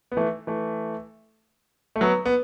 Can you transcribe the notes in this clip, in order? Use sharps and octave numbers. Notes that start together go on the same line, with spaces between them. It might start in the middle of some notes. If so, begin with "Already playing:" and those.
B3
E3 A3
E3 A3
A3
F#3 B3
B3